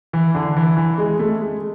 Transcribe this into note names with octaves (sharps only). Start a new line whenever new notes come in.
E3
D3
E3
E3
G#3
A3
G#3